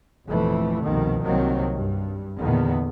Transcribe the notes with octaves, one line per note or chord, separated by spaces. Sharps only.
F1 F2 A#2 E3 A3
C2 F2 B2 D#3
C2 D#3 F#3 A#3 C4
G2
E2 A#2 D3 D#3 B3